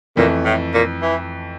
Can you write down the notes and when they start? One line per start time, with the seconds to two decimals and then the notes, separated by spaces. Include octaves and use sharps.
0.17 F2 A#2 E3 A3
0.45 A2
0.74 A#2
1.02 E3